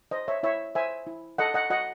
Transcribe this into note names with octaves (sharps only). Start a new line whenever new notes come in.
C5 D#5
C#5 E5
E4 C#5 E5
C5 E5 G#5
E4
A4 D#5 F#5
D#5 F#5
F#4 D#5 F#5